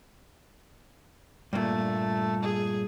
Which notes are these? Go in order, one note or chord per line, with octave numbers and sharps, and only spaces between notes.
G2 A#2 A3
G#4